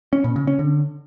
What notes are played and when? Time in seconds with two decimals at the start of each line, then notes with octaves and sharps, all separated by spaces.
0.13 C#4
0.24 A#2
0.36 C#3
0.47 C#4
0.59 D3